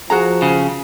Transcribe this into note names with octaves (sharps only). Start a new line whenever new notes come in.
F3 F#4 G#4 A#5
C#3